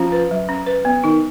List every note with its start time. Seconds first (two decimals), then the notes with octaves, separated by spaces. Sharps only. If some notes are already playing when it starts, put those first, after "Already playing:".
Already playing: F3 C#4
0.12 B4
0.31 F#3
0.49 C#4
0.66 B4
0.85 B3
1.04 D#3 D#4